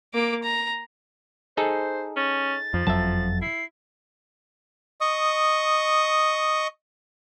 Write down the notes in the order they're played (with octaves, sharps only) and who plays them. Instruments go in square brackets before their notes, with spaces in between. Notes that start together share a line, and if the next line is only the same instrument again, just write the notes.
[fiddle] A#3 D6
A#5
[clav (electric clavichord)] D#4 G#4 A4 [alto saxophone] C5
[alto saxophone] C#4 [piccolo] A6
[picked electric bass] F2 [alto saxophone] F3
[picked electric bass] F#1 F2 F#3 [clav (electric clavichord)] E5 A5
[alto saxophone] E4 [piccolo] C7
[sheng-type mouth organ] D#5 C#6 D#6